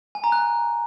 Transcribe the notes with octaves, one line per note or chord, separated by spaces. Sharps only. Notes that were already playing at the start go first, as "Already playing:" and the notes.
G#5
A#5
F#6